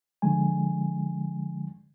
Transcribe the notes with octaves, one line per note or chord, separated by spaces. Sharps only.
D3 F3 G#3 G#5